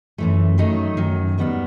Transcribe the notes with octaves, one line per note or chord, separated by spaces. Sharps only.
F#2 E3 A3
D#3 F#3 A3 D#4
F#2 D#3 F#3
D#2 D#3 G3 B3 F#4